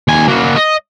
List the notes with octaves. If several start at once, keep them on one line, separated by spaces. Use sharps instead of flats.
D#2 G#5
A#3 F#4
D#5